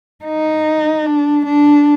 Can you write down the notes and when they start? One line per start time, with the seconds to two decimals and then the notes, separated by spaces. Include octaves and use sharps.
0.25 D#4
1.06 D4
1.45 D4